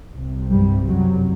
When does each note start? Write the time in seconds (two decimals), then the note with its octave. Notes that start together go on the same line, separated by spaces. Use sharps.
0.13 C2 C3
0.50 G2 G3
0.87 F#2 F#3